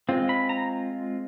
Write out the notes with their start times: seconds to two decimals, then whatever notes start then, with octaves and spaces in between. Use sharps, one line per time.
0.09 G#3 C4 F4
0.29 B5
0.49 A#5